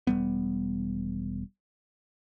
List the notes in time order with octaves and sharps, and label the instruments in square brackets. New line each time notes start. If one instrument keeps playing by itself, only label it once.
[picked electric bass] E1 G3 B3